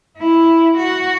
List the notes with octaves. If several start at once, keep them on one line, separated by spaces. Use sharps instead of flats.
E4
F#4